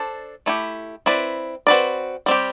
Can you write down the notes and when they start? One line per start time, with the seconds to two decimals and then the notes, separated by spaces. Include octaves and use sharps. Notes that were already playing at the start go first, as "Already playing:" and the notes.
Already playing: D4 A4 C5
0.46 A3 E4 G4
1.06 C4 E4 B4 D5
1.67 C4 F#4 B4 D5
2.26 G3 C4 G4